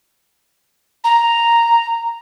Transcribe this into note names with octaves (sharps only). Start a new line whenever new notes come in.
A#5